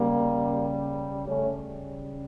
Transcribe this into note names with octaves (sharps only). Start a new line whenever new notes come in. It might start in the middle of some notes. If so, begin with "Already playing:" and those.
Already playing: C#3 G3 A#3
C#3 G3 A3 C#4